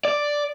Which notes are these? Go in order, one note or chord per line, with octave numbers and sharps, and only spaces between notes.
D5